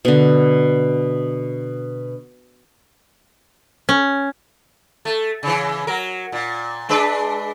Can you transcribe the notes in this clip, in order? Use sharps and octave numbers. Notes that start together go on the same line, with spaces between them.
B2 D3
C#4
A3
C#3 E3
F#3 A#4
A#2
G#3 D4 B4